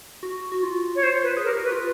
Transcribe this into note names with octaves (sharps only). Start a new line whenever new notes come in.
F#4
F#4
F4
C#5
F4 C5
B4
G#4
A#4
G4
F#4 B4
F4